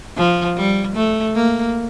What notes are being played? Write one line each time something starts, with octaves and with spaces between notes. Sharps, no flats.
F3
G3
A3
A#3